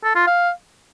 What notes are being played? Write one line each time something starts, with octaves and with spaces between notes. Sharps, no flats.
A4
F4
F5